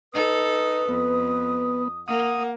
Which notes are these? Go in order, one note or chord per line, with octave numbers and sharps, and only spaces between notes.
D#4 A4 B4 D#6
F2 B3
A#3 F#5 D#6